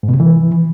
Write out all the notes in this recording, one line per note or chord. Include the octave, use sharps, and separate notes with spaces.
G#2
B2
C3
E3